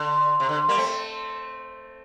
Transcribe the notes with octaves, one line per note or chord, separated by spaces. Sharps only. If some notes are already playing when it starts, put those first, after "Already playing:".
Already playing: D3
C3
D3
G3 A#3
A3 C4